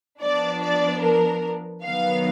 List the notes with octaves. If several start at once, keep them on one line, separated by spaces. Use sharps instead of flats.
F3 B3 D4 D5
D5
A#4
D#3 F#3 B3 F5